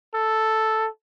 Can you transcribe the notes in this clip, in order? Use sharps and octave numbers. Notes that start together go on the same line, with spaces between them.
A4